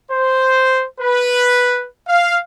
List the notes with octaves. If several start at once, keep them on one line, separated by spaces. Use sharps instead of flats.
C5
B4
F5